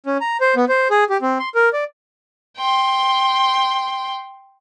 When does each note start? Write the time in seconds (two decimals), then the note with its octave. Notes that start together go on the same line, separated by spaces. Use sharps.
0.06 C#4
0.21 A#5
0.41 C5
0.56 B3
0.69 C5
0.91 G#4
1.10 G4
1.22 C4
1.39 C6
1.55 A#4
1.73 D5
2.58 G5 C6